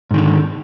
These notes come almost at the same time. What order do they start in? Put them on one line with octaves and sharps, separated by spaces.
G#2 D#3 D3